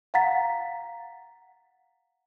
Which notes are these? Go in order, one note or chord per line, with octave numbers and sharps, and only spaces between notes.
F5 F#5 A#5 A6 B6